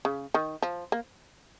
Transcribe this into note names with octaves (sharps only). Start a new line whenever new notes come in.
C#3
D#3
F3
A#3